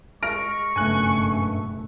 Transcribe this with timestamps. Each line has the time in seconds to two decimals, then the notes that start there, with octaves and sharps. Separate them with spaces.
0.23 G#3 C#6 F6 A#6 D7
0.76 F#1 G2 B2 A3 G#5 F#6